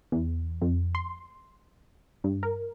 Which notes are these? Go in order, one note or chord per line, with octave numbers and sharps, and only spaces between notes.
E2
F2
C6
G2
A#4